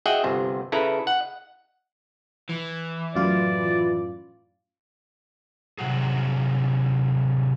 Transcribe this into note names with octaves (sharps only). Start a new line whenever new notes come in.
F#4 G#4 D#5 E5 F#5 G5
G1 C3
C#3 E4 A4 B4 A#5
F#5
E3
F#2 A2 F4 D5
C3 F#3 F#4 G#4